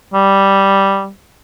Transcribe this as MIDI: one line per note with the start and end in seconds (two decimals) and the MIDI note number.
0.14 1.09 55